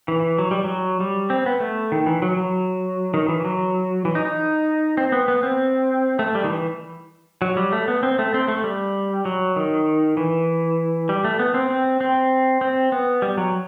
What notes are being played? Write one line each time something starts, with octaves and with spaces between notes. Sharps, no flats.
E3
F#3
G3
F#3
G3
C4
B3
A3
D#3
E3
F#3
F#3
D#3
E3
F#3
E3
D#4
D#4
C4
B3
B3
C4
A3
G3
D#3
E3
F#3
G3
A3
B3
C4
A3
C4
A3
G3
F#3
D#3
E3
G3
A3
B3
C4
C4
C4
C4
B3
G3
F#3